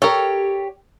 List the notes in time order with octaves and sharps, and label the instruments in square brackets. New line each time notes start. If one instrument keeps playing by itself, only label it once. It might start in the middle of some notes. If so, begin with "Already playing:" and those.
[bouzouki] G4 C#5 [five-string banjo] A4 A#4